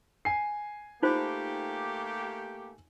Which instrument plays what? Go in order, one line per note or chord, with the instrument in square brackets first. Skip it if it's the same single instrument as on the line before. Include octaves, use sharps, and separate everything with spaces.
[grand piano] G#5 C7
[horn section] A3 A#3 G4 [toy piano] D#4 F4 C5